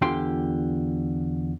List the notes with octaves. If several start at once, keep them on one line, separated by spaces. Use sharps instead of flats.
E2 D3 F4 G4 G5 C6